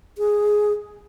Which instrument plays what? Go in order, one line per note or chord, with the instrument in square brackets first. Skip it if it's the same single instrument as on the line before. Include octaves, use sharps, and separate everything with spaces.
[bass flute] G#4